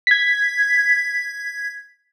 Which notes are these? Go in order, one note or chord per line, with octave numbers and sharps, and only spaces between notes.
G#6 B6